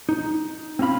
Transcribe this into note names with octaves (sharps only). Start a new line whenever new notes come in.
D#4
C4 C#4 F4 F5 B5